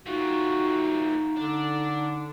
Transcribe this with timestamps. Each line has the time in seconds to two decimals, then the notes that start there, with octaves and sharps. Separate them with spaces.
0.06 A3 D#4 F4 F#4
1.37 D3 D4